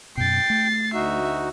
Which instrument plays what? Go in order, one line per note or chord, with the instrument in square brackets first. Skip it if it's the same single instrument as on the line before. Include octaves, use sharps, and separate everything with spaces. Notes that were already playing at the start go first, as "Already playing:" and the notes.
[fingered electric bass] F#2 B2 [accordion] G5 [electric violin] A6 C7
[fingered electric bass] A3
[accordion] D2 D#4 F#4 [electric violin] E5